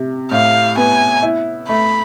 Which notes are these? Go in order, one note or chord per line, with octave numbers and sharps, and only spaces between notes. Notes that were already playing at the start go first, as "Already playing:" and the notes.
Already playing: C3
A2 F5
B3 G#5
E4
A3 B5